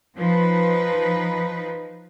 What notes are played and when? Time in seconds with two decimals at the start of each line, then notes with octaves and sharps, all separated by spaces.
0.17 F3 D#4 B4